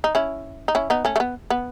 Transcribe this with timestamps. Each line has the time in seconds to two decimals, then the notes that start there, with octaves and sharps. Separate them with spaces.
0.04 D#4
0.15 C#4 E4
0.68 D#4
0.75 C#4 E4
0.90 B3 D#4
1.05 A3 C#4
1.16 A3
1.20 B3
1.50 B3